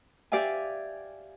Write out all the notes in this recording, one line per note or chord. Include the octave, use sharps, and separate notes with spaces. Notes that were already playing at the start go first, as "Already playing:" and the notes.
G4 D5 E5 F5 G#5